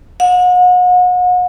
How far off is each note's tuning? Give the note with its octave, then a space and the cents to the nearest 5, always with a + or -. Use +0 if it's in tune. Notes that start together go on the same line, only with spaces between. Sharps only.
F#5 -40